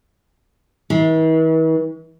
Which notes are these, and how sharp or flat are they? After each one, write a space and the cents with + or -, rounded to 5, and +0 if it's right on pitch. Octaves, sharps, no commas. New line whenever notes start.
E3 -45